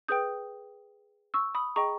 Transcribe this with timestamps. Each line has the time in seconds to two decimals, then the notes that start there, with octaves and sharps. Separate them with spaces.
0.08 G#4 B4 G5 D#6 G6
1.34 C#6 E6
1.55 B5 D#6
1.76 G#4 D#5 G5 A#5 C#6